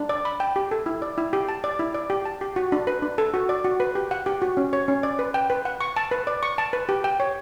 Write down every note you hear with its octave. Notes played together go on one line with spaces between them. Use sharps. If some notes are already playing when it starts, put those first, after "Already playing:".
Already playing: D4
D5
B5
G5
G4
A4
E4
D5
E4
G4
A5
D5
E4
D5
G4
A5
G4
F#4
D4
B4
D4
A4
F#4
D5
F#4
B4
G4
F#5
G4
F#4
C#4
C#5
C#4
D5
B4
G5
B4
F#5
C#6
A5
B4
D5
C#6
A5
B4
G4
G5
C#5